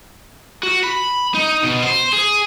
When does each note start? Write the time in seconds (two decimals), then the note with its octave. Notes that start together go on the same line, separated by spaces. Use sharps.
0.63 F#4
0.84 B5
1.34 D#4
1.63 B2
1.83 C5
2.13 G#4